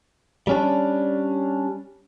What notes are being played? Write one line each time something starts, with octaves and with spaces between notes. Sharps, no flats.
G3 C#4 D4